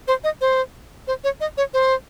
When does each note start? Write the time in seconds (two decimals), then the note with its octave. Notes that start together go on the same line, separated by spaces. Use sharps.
0.08 C5
0.24 D#5
0.41 C5
1.07 C5
1.24 C#5
1.41 D#5
1.57 C#5
1.74 C5